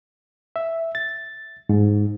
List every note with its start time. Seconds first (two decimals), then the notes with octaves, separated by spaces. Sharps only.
0.56 E5
0.95 A6
1.69 G#2